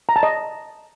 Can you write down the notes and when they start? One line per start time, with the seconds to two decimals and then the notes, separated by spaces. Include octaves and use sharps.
0.09 A#5
0.16 A5
0.23 D#5